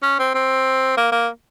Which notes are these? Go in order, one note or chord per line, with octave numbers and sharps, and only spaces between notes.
C#4
C4
C4
A#3
A#3